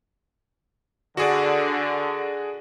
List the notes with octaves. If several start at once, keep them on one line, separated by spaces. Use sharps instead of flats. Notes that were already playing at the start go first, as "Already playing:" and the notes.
D3 F#4 G#4 D5